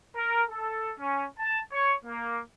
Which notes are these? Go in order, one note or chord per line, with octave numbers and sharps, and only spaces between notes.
A#4
A4
C#4
A5
C#5
A#3